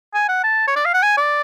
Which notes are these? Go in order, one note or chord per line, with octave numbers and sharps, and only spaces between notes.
G#5
F#5
A5
C#5
D5
F5
F#5
G#5
D5